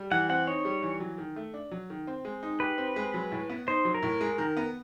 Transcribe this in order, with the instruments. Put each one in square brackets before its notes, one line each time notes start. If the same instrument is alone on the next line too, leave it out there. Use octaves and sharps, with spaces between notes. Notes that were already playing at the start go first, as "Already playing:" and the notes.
Already playing: [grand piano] G3
[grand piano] E3 [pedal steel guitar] F#5
[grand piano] C4 [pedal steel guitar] F#5
[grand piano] D#4 [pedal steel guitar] C#5
[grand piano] G3
E3
F#3
D#3
A3
D4
F#3
D#3
C4
G#3
D#4
[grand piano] G4 [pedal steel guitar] B4
[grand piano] C4
G#3
F#3
A2
B3
[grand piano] D#4 [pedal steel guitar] C5
[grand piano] F#3
[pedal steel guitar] A#4
[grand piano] A2
G#3
D#3
B3